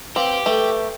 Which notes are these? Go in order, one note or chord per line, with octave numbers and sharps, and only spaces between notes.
C4 G4 B4 F5 F#7
A3 A4 B4